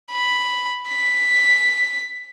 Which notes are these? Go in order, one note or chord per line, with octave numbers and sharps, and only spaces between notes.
B5
B6